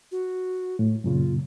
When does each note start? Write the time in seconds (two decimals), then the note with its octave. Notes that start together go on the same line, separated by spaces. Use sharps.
0.12 F#4
0.79 A2
1.04 F#2 A#2 C#3 F4